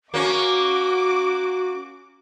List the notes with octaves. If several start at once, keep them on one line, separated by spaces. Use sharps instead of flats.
A#3 C#4 F#4 D6